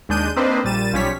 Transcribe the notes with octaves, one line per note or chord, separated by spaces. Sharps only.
D#2 G#3 D4 G6 D#7
A#3 C4 D4 D#4 B4 C5
A#1 A#2 G3 A6 D#7 E7
B1 F3 G3 C#4 C#5 B6